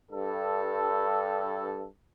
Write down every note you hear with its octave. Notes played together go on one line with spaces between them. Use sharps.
G2 A4